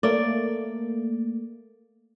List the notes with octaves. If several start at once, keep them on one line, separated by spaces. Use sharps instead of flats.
A3 A#3 D5